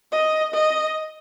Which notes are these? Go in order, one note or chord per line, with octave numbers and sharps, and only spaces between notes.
D#5
D#5